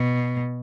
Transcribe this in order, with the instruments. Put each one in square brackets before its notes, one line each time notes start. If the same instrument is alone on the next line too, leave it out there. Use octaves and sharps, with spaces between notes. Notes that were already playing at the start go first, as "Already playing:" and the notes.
Already playing: [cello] B2